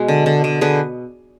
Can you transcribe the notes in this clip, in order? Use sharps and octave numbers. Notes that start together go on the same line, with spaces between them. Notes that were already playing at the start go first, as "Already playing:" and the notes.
Already playing: B2 G#3 G#4 B4
D3
D3
D3
D3 G#4 B4